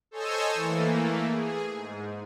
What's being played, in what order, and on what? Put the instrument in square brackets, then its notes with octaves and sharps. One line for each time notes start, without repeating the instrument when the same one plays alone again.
[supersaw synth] A4 C5 C#5 D#5 G#5 E6
E3 A3 A#3
G#4
G#2